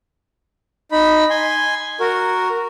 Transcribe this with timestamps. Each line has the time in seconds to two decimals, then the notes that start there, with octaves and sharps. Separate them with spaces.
0.92 D#4 B5
1.30 G#5 C6
2.00 F#4 A#4